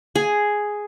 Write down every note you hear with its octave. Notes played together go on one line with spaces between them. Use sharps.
G#4